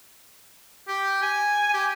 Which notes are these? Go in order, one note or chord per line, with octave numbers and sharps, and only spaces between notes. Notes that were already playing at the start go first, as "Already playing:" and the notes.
G4
G#5
G4